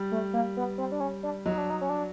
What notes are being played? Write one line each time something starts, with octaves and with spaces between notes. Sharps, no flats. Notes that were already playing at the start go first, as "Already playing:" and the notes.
Already playing: G3
A3
A#3
B3
C4
D4
C#4
D4
F#3 D#4
D4
D#4
C#4
D4